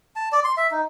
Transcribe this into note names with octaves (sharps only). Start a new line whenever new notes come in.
A5
D5
C6
E5
D#4